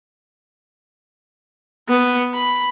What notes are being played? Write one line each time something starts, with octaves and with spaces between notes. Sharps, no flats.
B3
B5